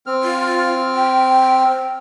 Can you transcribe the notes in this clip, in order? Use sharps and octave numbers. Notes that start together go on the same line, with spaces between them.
C4 F6
F4
G5